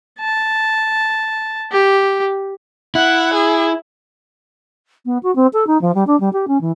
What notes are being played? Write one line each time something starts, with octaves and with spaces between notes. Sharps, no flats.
A5
G4
E4 F#5
G#4
B3
F#4
C4
A4
D#4
F3
G3
D4
G3
G4
C#4
E3